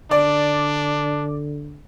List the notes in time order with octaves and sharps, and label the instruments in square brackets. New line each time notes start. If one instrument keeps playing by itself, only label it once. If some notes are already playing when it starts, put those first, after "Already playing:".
[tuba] D3 [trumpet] D4 [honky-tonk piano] D5